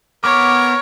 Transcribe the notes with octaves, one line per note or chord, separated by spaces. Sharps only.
B3 A#4 C#5 D6